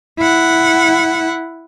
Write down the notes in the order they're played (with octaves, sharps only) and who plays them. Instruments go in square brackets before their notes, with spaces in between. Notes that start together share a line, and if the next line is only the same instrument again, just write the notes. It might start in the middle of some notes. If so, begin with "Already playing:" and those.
[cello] E4 F#5